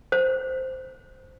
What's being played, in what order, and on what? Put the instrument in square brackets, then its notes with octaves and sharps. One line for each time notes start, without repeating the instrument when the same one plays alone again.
[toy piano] C5